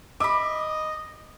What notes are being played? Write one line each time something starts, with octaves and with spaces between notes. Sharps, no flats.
D#5 E5 B5 D6